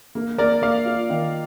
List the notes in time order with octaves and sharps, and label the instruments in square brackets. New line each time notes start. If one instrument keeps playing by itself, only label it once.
[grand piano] A#3
[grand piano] A#3 [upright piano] A#4 D5
[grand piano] A#3 [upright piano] D5 F5
[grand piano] F4
D#3